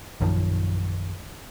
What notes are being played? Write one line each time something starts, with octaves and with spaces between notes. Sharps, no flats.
A#1 F#2 D#3 F3